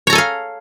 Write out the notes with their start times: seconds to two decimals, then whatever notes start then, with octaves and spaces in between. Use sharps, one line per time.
0.07 C#5
0.10 A#5
0.13 A4
0.15 G#5
0.18 F5